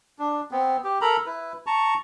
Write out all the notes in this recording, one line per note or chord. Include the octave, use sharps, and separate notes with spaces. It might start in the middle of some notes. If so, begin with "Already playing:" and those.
D4
B3 C4
G4
A4 A#4 A#5 B5
E4 B4
A5 A#5 C#6